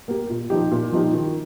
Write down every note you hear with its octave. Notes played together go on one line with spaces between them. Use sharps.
A#3 G4
A#2
F3 D#4 G4
A#2
F3 D#4 G4
D#3